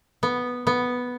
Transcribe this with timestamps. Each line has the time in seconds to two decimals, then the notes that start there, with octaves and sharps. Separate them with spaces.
0.23 B3
0.67 B3